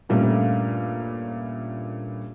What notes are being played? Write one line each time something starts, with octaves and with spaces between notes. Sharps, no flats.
G2 A#2 G3 A3 A#3 C#4